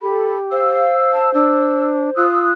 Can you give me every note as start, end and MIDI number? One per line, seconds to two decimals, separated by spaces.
0.02 0.83 67
0.02 0.37 69
0.02 0.37 83
0.52 2.26 72
0.52 1.30 77
0.52 1.30 88
1.13 1.32 81
1.34 2.10 62
1.34 1.86 88
2.17 2.52 65
2.17 2.53 87
2.17 2.53 88
2.17 2.53 90